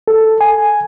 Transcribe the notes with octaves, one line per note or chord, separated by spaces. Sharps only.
A4
G#5